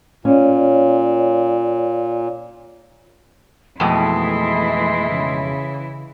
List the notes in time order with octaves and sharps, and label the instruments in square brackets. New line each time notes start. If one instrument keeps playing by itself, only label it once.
[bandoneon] A#2 [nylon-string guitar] C#4 [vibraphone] C#5 D5 F5
[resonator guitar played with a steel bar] F2 B2 [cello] E3 E4 [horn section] G#3 D#4 C6 [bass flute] A3
[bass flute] C#3